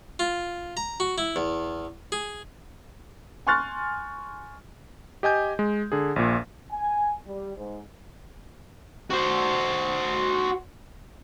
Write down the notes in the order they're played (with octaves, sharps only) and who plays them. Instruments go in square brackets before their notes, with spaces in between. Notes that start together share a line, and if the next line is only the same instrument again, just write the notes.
[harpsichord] F4
A#5
F#4
E4
E2
G#4
[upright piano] G#5 C6 C#6 F6 F#6 A6
[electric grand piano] G4 D#5 G#5 G6
G#3
D3 G#4
A#1 A#2
[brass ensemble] G#5
G3
G#2
[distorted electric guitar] F#4 C5